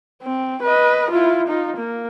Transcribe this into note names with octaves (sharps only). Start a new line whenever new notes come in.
C4
B4 D#5
E4 F4
D#4 F4
A#3